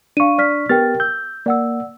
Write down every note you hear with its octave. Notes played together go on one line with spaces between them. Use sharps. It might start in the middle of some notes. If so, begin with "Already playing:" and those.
D4 F5 C#6 D#7
D5 F6 B6
B3 G4 A#4 G5 F6 A6
E6 G6
A#3 D5 F#5 E6